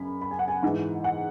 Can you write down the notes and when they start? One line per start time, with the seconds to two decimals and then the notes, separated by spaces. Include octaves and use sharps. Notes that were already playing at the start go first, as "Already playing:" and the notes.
Already playing: F#2 C#3 G#5 B5
0.22 B5
0.31 G#5
0.39 F#5
0.48 G#5
0.63 G#2 E3 F#5
1.04 F#5